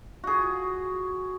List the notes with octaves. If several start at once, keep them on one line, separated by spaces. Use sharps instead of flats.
F#4 G#4